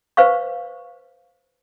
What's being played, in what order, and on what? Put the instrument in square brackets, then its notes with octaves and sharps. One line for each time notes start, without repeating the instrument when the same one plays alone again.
[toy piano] B4 C5 F5 C#6